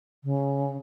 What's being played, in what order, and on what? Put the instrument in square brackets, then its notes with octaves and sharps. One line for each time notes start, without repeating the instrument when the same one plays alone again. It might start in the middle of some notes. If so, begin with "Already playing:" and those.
[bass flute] C#3